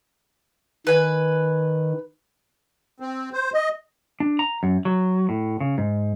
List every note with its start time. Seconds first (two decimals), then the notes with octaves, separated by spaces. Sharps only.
0.87 D#3 B4 G#5
3.00 C4
3.33 C5
3.54 D#5
4.20 D4
4.39 A#5
4.63 F#2
4.85 F#3
5.29 A2
5.60 C#3
5.78 G#2